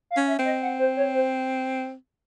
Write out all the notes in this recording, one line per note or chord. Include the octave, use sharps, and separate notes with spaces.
F5
C#4
E5
C4
D#5
F#5
C5
C#5
C5